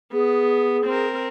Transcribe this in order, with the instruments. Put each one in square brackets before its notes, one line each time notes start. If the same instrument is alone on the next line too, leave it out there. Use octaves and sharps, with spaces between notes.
[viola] B3 [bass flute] G#4
[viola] C4 A#4